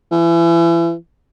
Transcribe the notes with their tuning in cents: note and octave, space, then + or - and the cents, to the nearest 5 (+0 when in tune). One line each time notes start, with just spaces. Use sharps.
E3 +35